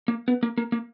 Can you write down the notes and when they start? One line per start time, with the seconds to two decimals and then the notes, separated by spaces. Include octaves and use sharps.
0.08 A#3
0.28 B3
0.43 A#3
0.58 A#3
0.72 A#3